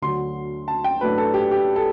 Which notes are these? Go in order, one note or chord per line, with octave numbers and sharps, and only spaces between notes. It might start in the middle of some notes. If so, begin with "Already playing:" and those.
D2 D3 F#3 C6
A5
G5
A2 F#3 A3 D4 B4
A4
G4
G4
A4